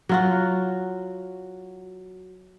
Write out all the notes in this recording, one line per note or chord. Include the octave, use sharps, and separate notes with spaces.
F#3 F4 F#4